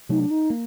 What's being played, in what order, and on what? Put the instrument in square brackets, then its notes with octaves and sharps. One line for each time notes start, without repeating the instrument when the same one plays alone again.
[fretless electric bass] C3 F#3 A3 [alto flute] D#4
[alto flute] D4
D#4
[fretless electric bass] A#3